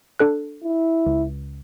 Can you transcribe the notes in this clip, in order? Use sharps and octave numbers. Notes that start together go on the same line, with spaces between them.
D4 A4 F#6
E4
C#2